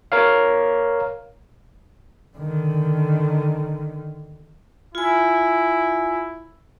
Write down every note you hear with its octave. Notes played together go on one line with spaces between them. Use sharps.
A#4 C#5 F5
D3 D#3
E4 F4 G#5